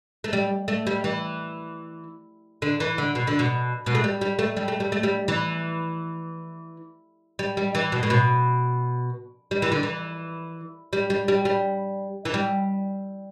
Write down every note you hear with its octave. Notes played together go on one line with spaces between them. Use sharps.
A3
G3
A3
G3
E3
D3
E3
D3
B2
D3
B2
B2
A3
G3
G3
A3
G3
A3
G3
A3
G3
E3
G3
G3
E3
B2
A2
B2
G3
E3
D3
E3
G3
G3
G3
G3
E3
G3